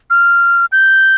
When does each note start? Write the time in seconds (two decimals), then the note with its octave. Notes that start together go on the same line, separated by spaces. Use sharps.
0.10 F6
0.72 G6